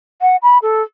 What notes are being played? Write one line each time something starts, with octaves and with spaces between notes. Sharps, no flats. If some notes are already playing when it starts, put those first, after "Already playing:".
F#5
B5
A4